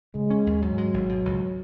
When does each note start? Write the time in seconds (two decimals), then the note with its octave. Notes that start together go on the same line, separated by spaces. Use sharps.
0.15 C#3 G#3
0.30 C#4
0.47 D#2
0.62 G#2 F#3
0.78 G#3
0.94 G#1
1.09 B2
1.25 C#2